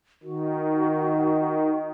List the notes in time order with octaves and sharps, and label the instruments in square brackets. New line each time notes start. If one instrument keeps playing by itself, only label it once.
[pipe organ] D#3 [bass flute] F#4